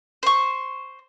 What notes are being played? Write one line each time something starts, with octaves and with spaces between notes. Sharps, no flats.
C5 C#6